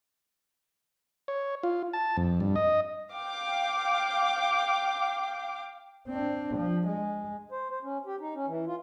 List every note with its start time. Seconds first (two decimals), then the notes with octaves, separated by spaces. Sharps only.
1.28 C#5
1.63 F4
1.93 A5
2.17 F2
2.40 G2
2.56 D#5
3.12 F5 G5 D6
6.08 C4 D4
6.57 F3
6.88 G#3
7.52 C5
7.70 C5
7.83 C#4
8.06 G4
8.20 D#4
8.35 C#4
8.47 E3
8.67 F4